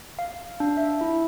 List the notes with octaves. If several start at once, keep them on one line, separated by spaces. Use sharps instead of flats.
F5
D4
E5
E4